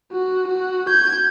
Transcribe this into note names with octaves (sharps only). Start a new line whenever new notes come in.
F#4
F#4
G6 G#6